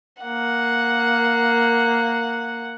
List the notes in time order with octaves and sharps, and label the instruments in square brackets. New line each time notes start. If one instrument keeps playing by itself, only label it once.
[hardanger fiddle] A#3 F#5